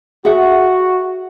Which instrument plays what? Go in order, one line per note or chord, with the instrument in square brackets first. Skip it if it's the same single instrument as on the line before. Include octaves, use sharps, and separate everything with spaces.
[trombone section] F#4 [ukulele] G#4 E5 F#5